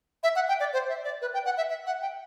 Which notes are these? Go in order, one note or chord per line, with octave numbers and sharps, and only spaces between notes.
E5
F#5
G5
D5
C5
E5
D5
B4
G5
F#5
E5
E5
F#5
G5